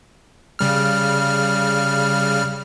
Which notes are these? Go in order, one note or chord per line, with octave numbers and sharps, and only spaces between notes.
C#3 G3 F6